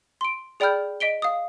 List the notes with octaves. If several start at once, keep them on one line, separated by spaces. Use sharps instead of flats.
C6 D7
G#4 D5 G5 B5 F6 G6
D#5 B6 D7 G7
F5 D#6